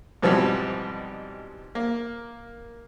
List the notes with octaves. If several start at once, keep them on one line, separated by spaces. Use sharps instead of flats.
G#2 B2 E3 F3 G3 C4
A#3